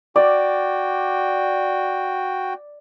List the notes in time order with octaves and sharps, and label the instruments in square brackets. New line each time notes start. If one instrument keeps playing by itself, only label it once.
[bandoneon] F#4 G5 [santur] D5